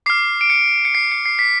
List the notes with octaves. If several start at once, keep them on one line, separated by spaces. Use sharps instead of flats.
D6 F6 C7
D7
C#7
C#7
C7
C#7
C7
B6